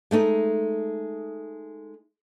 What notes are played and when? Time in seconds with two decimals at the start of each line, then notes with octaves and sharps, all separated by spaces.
0.11 G#3 A3 C#4 D#4